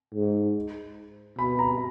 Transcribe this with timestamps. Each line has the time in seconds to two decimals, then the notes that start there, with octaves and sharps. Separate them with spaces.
0.15 G#2
1.39 B2 B5
1.59 A#5